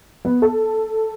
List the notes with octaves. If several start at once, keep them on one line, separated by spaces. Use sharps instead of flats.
B3
A4